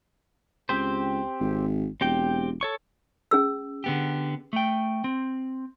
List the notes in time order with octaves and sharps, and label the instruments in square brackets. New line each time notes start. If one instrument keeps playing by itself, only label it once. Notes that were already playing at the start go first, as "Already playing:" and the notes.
[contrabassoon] C#2 [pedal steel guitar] C4 G4 C5
[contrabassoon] G#1
[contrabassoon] E1 [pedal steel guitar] C4 G4 G5
[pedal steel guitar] A4 C#5 C#6
[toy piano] C#4 G#4 E6
[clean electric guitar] D3 B3 G4
A3 G5
C4